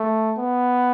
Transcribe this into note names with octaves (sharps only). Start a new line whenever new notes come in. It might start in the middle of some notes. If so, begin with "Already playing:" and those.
Already playing: A3
B3